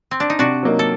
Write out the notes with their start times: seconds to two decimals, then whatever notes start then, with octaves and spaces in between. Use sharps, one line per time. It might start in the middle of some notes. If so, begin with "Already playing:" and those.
0.11 C4
0.20 D4
0.30 D#4
0.39 C3 D4 F#4
0.63 F#3 A#3 D#4
0.79 A4